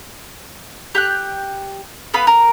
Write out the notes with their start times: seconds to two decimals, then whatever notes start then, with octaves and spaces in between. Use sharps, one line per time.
0.95 G4 G5 F#6
2.14 B3 F5 B5 D#6
2.27 A#4